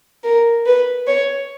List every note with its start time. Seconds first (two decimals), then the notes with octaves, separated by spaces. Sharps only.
0.24 A#4
0.66 B4
1.07 C#5